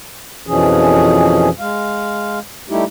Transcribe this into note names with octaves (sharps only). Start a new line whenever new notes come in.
F2 B2 E3 F3 C#4 G#4
G#3 F5
G3 A3 D#4 E4 G4